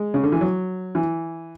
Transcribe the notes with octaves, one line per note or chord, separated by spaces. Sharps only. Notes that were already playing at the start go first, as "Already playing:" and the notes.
Already playing: G#3
C#3
D3
E3
F#3
E3